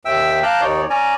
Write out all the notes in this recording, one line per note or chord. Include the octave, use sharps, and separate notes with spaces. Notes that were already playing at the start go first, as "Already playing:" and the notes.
D#2 E5 G5 E6
F5 A5 A#5 D6 F#6 G6
D#2 D#4 C#5 D5
C#4 D5 G#5 A#5